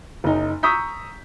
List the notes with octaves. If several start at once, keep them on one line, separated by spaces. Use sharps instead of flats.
F#1 D#4
A#5 C#6 D#6 E6 G6 B6